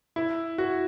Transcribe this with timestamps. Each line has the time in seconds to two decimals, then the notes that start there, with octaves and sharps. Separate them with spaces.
0.16 E4
0.58 F#4